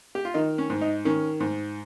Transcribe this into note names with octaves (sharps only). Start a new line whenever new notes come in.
G4
F4
D#3 D#4
C#4
G#2
D#4
D#3 C#4
G#2